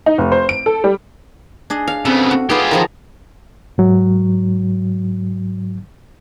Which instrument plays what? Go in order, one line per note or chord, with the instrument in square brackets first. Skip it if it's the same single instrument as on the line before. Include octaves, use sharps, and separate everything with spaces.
[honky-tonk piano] D#4
F1
C5
D7
A4
G3
[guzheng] D4 G#4 D#5
[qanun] F5
[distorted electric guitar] C#3 B3 [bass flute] C4 [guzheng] A4
[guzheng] F#4
[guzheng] B3 D#4 [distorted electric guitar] F4 G4 [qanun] G#4 B4
[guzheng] D#3 F3 [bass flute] D#4 [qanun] G#4 A5 A#5
[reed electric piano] G#2 F#3